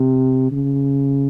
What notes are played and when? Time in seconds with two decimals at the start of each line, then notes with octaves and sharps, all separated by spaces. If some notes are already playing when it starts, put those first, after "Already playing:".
Already playing: C3
0.52 C#3